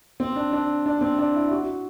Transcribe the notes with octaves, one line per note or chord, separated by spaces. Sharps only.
C4
D4
D4
D4
C4
D4
E4
F#4